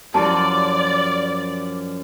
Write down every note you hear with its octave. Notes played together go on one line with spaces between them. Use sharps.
F#2 F3 E4 G4 D5 A5